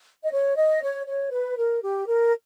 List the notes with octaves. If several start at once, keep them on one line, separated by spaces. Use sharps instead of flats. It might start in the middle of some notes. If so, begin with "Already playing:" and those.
D#5
C#5
D#5
C#5
C#5
B4
A#4
G4
A#4